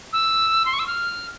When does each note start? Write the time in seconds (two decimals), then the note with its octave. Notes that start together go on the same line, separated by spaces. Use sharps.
0.13 E6
0.66 C6
0.73 C#6
0.79 E6
0.87 F6